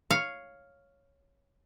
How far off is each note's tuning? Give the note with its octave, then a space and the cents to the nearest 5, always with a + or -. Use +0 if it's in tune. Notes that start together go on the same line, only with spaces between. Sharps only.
C#5 +0 F5 +0